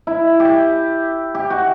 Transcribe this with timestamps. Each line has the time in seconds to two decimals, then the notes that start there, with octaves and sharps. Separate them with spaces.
0.07 E4
0.40 G4
1.35 G4
1.50 F#4